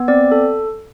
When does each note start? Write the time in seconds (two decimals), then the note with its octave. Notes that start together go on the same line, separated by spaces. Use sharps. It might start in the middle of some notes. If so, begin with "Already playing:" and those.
Already playing: B3
0.08 C4 D5
0.32 A4